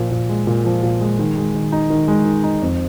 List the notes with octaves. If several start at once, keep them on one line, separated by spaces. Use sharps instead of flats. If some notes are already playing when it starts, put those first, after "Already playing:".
Already playing: A#2 F3
A#2
G#3
A#2
F3
A#2
G#3
D#3
G#3
D#3
D#4
D#3
G#3
D#3
D#4
F2